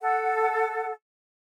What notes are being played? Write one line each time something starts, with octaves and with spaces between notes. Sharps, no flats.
A4 F#5